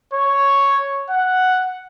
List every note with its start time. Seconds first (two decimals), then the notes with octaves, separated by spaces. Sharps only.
0.14 C#5
1.10 F#5